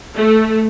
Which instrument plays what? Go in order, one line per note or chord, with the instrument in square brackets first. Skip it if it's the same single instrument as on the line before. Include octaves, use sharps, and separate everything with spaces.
[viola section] A3